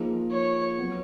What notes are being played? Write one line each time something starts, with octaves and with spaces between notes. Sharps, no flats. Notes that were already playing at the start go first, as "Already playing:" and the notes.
Already playing: F3 A#3 D#4 G#4
C#5
F#3 B3